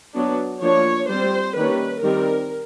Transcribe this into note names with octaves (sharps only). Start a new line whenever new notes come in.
F#3 B3 D4
F3 A#3 D4 C#5
G3 C4 C5
D#3 G3 A#3 C#4 B4
D#3 G3 C4 A#4